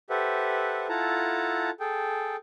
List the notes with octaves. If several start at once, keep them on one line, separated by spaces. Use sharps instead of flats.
G4 A4 B4 C5 E5 F#5
E4 F4 A4 F#5 A5 A#5
G#4 A4 G5